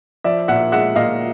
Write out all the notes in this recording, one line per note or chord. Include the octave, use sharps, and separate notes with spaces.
F3 D5 E5
A#2 E5 F#5
G#3 E5 F#5
A#2 D#5 F5